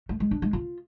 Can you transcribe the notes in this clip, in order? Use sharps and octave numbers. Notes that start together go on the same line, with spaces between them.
A3
G#3
D4
G#3
F4